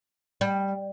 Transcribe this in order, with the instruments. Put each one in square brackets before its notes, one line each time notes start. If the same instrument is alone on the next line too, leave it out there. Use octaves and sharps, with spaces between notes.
[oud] G3